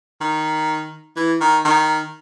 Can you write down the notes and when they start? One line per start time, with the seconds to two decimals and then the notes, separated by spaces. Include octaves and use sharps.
0.21 D#3
1.16 E3
1.41 D#3
1.65 D#3